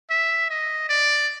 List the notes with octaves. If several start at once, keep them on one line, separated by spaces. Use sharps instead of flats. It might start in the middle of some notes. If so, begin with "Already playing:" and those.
E5
D#5
D5